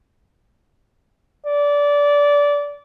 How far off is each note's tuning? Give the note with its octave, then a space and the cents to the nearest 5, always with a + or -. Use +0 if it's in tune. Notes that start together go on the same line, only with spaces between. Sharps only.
D5 -20